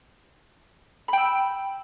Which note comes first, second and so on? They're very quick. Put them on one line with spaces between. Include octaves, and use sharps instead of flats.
B5 G5 E6